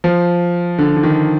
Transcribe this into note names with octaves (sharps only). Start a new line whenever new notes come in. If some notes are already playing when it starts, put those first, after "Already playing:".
F3
D3
D3
D#3